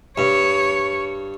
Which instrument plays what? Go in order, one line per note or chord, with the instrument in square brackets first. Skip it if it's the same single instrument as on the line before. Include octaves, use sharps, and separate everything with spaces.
[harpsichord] G2 [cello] C#5